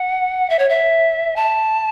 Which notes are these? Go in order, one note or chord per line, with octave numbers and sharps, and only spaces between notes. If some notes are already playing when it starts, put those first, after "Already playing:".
Already playing: F#5
E5
C#5
E5
A5